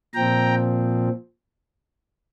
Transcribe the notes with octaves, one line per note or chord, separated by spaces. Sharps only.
A#2 F3 C4 G5 A#5